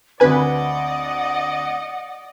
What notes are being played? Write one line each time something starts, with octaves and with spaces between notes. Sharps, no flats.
D2 C4 B4 D5 D#5 F#5 G#5 B5